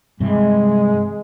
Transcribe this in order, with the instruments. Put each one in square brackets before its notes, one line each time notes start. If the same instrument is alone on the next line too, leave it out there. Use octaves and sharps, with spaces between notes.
[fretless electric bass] G2 C3 E3 [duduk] G#3